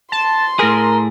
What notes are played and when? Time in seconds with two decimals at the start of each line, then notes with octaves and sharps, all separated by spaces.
0.12 A5 C6
0.59 A2 G#4 A#4